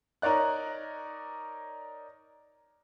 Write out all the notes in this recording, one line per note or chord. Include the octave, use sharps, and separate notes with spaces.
D#4 A#4 C#5 D5 F#6